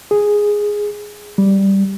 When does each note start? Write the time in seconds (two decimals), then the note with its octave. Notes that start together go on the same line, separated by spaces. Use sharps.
0.11 G#4
1.38 G3